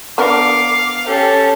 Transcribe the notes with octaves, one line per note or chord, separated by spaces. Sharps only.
B3 D4 A#4 F5 D6
C#4 G4 A4